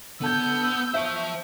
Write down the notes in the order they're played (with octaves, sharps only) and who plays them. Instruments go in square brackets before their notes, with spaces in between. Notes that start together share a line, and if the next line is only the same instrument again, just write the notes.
[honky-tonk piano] D3 A5 G#6 [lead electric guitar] B3 [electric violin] E6 G6
[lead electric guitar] C5 A5 [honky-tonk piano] E5 C#6